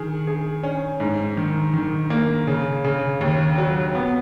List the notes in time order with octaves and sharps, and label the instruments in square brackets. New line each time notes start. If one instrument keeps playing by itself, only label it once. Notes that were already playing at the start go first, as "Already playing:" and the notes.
Already playing: [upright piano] D#3 G#4
G#4
C#4
G#2
D#3
D#3
A#3
C#3
C#3
D#2
F#3
B3